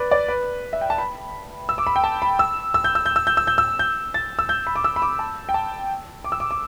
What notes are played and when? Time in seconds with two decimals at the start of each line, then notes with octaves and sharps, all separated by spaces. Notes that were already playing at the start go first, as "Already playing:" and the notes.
Already playing: B4 D5
0.11 D5
0.28 B4
0.73 E5
0.81 G5
0.90 A5
0.98 B5
1.69 E6
1.78 D6
1.87 B5
1.96 G5
2.04 A5
2.22 B5
2.39 E6
2.74 E6
2.84 G6
2.95 E6
3.06 G6
3.16 E6
3.27 G6
3.37 E6
3.47 G6
3.58 E6
3.79 G6
4.14 A6
4.39 E6
4.49 G6
4.67 B5
4.76 D6
4.84 E6
4.96 B5
5.02 D6
5.19 A5
5.49 G5
5.54 A5
6.24 D6
6.32 E6
6.40 D6
6.51 D6